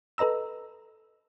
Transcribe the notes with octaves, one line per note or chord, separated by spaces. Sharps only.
A4 B4 D#5 A#5 E6